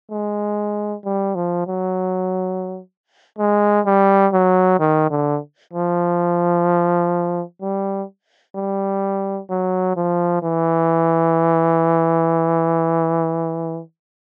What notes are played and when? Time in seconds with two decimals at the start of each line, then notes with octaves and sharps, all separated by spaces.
0.11 G#3
1.04 G3
1.35 F3
1.67 F#3
3.38 G#3
3.85 G3
4.33 F#3
4.79 D#3
5.10 D3
5.73 F3
7.61 G3
8.55 G3
9.49 F#3
9.96 F3
10.42 E3